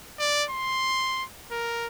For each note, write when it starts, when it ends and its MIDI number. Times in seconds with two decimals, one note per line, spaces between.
0.19 0.44 74
0.50 1.24 84
1.51 1.88 70